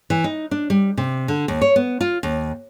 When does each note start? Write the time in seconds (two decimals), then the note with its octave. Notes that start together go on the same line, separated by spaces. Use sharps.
0.10 E3
0.24 D#4
0.51 D4
0.70 G3
0.97 C3
1.28 D3
1.48 D#2
1.61 C#5
1.76 B3
2.01 F4
2.23 D#2